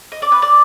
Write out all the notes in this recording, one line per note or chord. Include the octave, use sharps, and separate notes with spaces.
D#5
D5
B4
D5